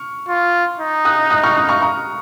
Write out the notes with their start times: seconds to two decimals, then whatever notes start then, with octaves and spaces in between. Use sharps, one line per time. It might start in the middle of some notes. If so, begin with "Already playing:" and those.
Already playing: C#6 F6
0.29 F4
0.79 D#4
1.05 D#6 F#6
1.30 D#6 F#6
1.43 C#6 F6
1.56 D#6 F#6
1.69 C#6 F6
1.82 A#5 C#6